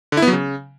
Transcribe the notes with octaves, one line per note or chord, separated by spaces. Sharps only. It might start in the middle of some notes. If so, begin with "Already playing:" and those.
D3
E4
B3
F#3
C#3